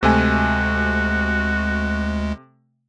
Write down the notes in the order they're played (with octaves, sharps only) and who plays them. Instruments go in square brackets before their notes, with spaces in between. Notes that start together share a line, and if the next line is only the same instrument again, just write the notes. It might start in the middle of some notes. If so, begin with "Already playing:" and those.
[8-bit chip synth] D2 G#3 [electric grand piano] C3 A3 G#5 [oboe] F#4